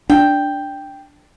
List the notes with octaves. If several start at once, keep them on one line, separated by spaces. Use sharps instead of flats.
D4 G5